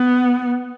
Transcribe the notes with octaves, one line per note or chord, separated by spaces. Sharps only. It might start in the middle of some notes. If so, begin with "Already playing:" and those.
Already playing: B3